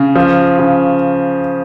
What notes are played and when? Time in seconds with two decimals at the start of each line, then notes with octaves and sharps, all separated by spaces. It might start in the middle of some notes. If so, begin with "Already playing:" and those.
Already playing: C#3
0.16 F3
0.59 C#3